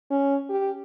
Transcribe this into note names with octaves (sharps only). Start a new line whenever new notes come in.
C#4
G4